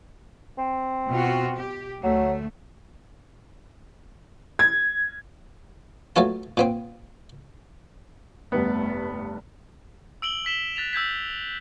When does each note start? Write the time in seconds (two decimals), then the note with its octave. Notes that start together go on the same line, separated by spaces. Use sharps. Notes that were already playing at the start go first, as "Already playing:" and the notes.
0.58 C4
1.09 B2 F4 F#4
1.56 G4
2.03 D2 F#3 A3
4.59 G#6
6.16 F#3 A3 B3 F4 A5
6.57 A#2 B3 C4
8.52 F1 G2 A3 B3 B4
10.22 E6 D7 F#7 G7
10.45 E6 B6 E7 G7
10.76 F#6 A6 B6 F7
10.93 E6 G6 G#6 B6